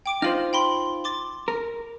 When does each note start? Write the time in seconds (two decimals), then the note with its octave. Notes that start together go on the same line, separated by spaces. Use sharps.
0.06 G5 D6 D7
0.22 D#4 F4 C5 F6 F#7
0.53 G5 B5 C6
1.04 C6 D6 A6
1.48 A#4